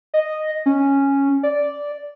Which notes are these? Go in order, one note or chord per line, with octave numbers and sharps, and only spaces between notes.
D#5
C#4
D5